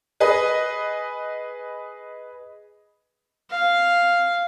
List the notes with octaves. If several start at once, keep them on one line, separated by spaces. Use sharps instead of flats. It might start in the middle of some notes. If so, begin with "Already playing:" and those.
G#4 B4 D#5
F5